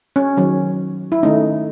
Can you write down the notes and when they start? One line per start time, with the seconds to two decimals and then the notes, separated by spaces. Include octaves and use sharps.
0.16 C#4
0.37 D#3 F#3 C#4
1.12 E4
1.23 D#3 A3 C#4 D#4